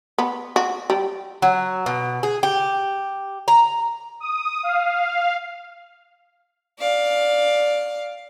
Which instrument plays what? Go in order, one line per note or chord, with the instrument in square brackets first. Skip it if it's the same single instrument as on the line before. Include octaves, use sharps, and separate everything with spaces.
[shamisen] B3
F#4
G3
[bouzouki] F#3
B2
G#4
G4
A#5
[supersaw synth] D#6
F5
[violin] D5 F5